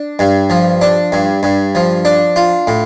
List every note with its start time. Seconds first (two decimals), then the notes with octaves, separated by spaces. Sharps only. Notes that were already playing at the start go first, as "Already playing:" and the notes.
Already playing: D4
0.19 G2
0.50 F3
0.81 D4
1.12 G2
1.43 G2
1.75 F3
2.05 D4
2.36 F4
2.67 A2